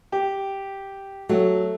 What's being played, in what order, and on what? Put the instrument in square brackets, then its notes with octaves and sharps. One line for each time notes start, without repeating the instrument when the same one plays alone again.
[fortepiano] G4
[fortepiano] F#3 [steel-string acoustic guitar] A3